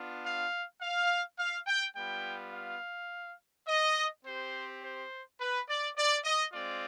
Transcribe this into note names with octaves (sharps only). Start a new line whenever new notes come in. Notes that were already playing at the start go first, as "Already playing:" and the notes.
Already playing: B3 D4 F4
F5
F5
F5
G5
G3 B3 F4 G5
F5
D#5
C4 G4 C5
C5
B4
D5
D5
D#5
G#3 C4 F4 D5